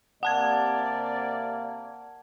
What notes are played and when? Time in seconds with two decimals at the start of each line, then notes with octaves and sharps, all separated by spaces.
0.23 C3 A#3 D5 F#5 A5 G#6